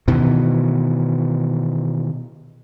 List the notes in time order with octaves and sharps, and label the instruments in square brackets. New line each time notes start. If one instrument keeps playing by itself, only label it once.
[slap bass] B2 D#3 E3